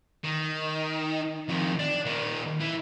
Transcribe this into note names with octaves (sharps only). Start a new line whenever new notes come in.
D#3
F2 D#3
D4
A#2 D#3
E3